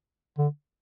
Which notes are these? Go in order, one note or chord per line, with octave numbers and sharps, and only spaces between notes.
D3